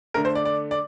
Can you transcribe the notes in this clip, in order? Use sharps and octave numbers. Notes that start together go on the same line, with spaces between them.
D3 A3 A#4
C5
D5
D5
D5